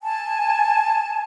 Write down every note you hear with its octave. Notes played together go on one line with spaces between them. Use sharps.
G#5 A5